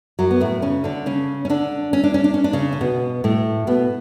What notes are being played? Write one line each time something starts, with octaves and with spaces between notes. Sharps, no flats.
F#2 F#3
B3
A2 A3
C#3 C#4
D3 D4
C#3 C#4
C#4
D3 D4
C#4
D4
C#4
D4
C#4
D4
C#3 C#4
C#4
B2 B3
A2 A3
B2 B3